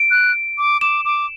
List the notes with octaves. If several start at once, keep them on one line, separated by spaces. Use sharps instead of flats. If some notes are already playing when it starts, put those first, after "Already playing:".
Already playing: D7
F#6
D6
D6 E7
D6